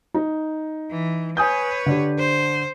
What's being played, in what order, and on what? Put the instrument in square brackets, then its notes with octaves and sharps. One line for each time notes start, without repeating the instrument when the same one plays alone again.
[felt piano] D#4
[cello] E3
[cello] B4 C#5 [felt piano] G#5 D#6 G6
[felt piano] D3 D4 G4
[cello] C5